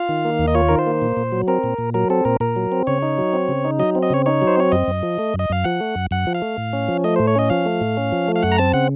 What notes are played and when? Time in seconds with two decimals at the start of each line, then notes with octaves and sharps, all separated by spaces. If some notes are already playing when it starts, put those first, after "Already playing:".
Already playing: F4 F5
0.09 D#3
0.25 A#3
0.39 D#2
0.48 D#5
0.55 F4 C#5
0.69 D#3 A#4
0.79 C5
0.87 A#3
1.02 A#2
1.17 A#2
1.32 F#3
1.48 C4 A#4
1.64 A#2
1.78 A#2
1.94 F#3 A#4
2.10 C4 A4
2.25 A#2 A#4
2.40 A#2 A#4
2.56 F#3
2.72 C4
2.87 C#3 C#5
3.02 D#4
3.18 F#3
3.33 C4
3.49 C#3
3.64 D#4
3.79 F#3 D#5
3.95 C4
4.03 D#5
4.10 C#3 C#5
4.26 D#4 C#5
4.42 F#3
4.47 C5
4.57 C4 C#5
4.72 F#2 D#5
4.88 F#2
5.03 F3
5.19 A3
5.34 F#2
5.39 D#5
5.50 F#2 F5
5.64 F3 F#5
5.80 A3
5.95 F#2
6.11 F#2 F#5
6.27 F3
6.34 F5
6.42 A3
6.58 A2
6.73 C#4
6.88 F3
7.04 A3 D#5
7.16 A2 C5
7.27 C#5
7.35 C#4 D#5
7.50 F3 F5
7.66 A3
7.81 A2
7.97 C#4
8.12 F3
8.28 A3
8.36 F5
8.43 F#2 F#5
8.52 A#5
8.58 C4 A5
8.74 C#3 F#5